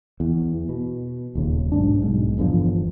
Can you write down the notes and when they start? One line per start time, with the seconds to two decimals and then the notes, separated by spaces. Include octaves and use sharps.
0.20 E2
0.69 B2
1.35 D#1 D#2 C#3
1.72 B1 G#2 D4
2.02 B1 G#2
2.38 G1 E2 D3 F3